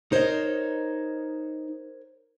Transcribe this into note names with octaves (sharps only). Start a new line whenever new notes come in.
D#4 A#4 C5 C#5 D#5